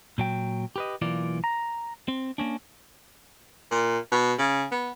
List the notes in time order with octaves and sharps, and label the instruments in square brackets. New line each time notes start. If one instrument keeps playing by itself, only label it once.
[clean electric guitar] A#2 F#3 G5
G4 B4 D#5
B1 E3 A#3 F4 D5
A#5
C4
A#3 C#4 D4
[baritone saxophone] A#2
B2
C#3
B3